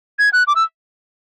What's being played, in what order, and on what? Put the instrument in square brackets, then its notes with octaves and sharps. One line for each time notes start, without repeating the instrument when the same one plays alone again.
[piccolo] G#6
F#6
D6
E6